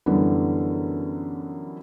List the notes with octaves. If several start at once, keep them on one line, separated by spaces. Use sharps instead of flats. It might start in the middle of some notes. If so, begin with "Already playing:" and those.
F#2 D3 E3 G3 B3